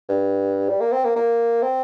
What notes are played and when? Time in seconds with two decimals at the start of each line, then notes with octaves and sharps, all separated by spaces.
0.09 G2
0.69 G3
0.81 A#3
0.92 C4
1.05 A#3
1.16 A#3
1.62 C4